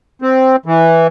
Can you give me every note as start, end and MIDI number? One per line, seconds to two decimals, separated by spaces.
0.22 0.56 60
0.66 1.07 52